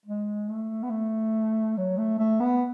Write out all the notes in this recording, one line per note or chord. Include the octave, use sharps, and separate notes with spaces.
G#3
A3
B3
A3
F#3
A3
A3
B3